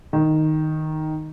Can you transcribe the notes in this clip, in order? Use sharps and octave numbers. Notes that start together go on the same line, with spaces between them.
D#3